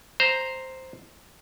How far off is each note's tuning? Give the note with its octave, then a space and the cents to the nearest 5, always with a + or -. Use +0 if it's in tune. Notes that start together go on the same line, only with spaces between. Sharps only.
C5 +0 A#5 +0